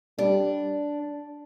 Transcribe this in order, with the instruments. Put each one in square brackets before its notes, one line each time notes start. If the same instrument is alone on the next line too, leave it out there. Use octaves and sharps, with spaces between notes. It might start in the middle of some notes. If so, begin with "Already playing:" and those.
[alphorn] G3 [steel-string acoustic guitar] D4